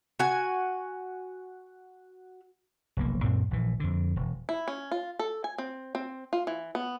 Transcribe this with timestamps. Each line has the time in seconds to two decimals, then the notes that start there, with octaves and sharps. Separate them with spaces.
0.19 F#4 G#5
2.97 F1 B1 A#3
3.24 F#2 A#2 C4
3.51 A#1 E3
3.80 F2 D3
4.16 E1
4.49 E4
4.68 C#4
4.91 F4
5.19 A4
5.44 G#5
5.58 C4
5.95 C4
6.33 F4
6.47 E3
6.75 B3